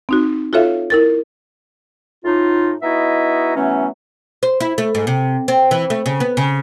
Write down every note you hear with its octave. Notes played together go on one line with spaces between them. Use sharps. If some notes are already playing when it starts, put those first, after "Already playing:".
C4 D#4 F#4
F4 F#4 A4 C#5 E5 F5
E4 A#4 A6
A2 D#4 F4
B3 D#4 E4 F#4 D#5 E5
E3 F#3 A3 B3 C#4
C5
E4
A3
G#2
C3
C4
E3
A3
C#3
B3
C#3